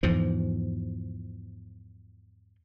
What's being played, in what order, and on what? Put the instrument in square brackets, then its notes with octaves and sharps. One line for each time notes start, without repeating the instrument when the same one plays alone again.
[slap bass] E2 G#2 F3